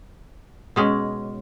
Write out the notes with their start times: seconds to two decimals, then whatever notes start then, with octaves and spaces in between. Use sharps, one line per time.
0.76 B2 G#3 C#4